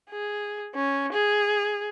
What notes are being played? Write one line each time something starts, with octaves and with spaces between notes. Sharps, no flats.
G#4
C#4
G#4